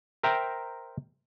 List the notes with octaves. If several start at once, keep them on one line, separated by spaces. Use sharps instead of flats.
A#4 C5 E5 G5 A#5